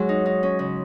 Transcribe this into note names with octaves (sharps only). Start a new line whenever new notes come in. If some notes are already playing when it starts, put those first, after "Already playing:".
Already playing: G#2 F#3 G#3
D#4
D#4
C#4
C#3